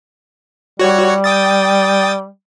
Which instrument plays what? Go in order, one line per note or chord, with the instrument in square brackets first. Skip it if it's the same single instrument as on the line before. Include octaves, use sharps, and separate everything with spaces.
[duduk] G3 [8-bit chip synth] F#4 C#5
[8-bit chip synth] G5 D#6 A6